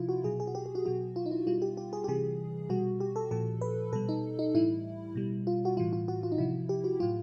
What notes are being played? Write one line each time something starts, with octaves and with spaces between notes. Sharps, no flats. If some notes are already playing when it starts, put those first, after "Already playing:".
Already playing: C3 F3 E4 F4
F#4
B2 F#3 G#4
G#4
F#4
G4
G4
F#4
B2 F#3 F#4
F4
D#4
E4
B2 G3 F4
G4
G4
G#4
G4
C3 E3 G3 G#4
B2 G3 F#4
G4
A4
A#2 F3 A4
B4
B2 G3 A4
D#4
D#4
A2 E3 G3 E4
B2 G3
F4
F#4
A2 E3 G3 F4
F4
F#4
F4
D#4
C3 F3 E4
G4
F#4
A2 F#3 F4